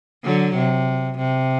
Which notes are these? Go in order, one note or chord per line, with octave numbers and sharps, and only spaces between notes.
D3 F#3
C3
C3